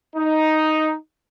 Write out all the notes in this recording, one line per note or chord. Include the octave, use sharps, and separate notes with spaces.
D#4